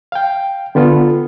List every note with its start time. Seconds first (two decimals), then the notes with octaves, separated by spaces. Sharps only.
0.12 F5 G5
0.75 D3 B3 F4 A4